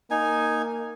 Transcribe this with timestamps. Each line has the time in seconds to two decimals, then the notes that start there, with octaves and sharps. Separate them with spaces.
0.11 A#3 D#4 G#5